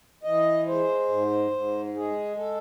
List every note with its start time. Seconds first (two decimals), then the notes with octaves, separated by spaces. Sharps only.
0.23 E3 D#5
0.67 G#3 C5
1.08 G#2
1.51 G#2
1.94 G#3 G#4
2.37 A4